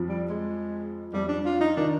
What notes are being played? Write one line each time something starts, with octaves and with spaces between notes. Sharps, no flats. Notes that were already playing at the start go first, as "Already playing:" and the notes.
Already playing: F2 F3
G3
G#3
F2 F3 G3
D4
F4
D#4
D#3 D4